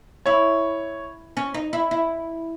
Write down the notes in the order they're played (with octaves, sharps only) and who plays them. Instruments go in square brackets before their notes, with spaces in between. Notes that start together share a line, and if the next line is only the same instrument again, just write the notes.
[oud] E4 [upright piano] C#5
[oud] C#4
D#4
E4
E4